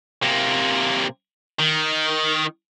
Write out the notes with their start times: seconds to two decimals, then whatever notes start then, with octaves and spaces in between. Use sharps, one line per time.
0.23 C3 A#3
1.59 D#3